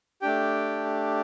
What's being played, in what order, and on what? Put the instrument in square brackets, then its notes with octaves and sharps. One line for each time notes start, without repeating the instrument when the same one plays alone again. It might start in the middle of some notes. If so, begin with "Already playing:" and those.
[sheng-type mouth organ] A3 D4 G4 G5